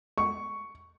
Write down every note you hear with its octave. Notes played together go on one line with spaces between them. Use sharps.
C#6